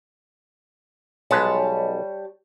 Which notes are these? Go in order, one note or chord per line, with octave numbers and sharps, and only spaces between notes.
B1 G3 G#3 B4 C#5 A5